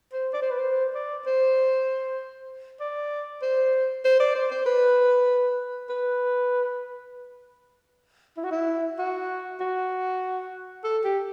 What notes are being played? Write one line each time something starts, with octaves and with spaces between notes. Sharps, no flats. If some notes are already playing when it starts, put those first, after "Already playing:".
C5
D5
C5
B4
C5
D5
C5
D5
C5
C5
D5
C5
C5
B4
B4
E4
F#4
E4
F#4
F#4
A4
G4